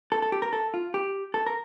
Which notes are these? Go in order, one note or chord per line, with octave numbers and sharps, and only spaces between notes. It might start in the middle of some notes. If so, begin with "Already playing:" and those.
A4
A4
G4
A#4
A4
F4
G4
A4
A#4